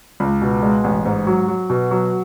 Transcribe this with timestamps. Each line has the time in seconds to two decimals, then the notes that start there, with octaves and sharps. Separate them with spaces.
0.20 C#2
0.42 B2
0.63 G#3
0.84 A1
1.05 G#2
1.27 F#3
1.48 F#3
1.70 B2
1.91 F#3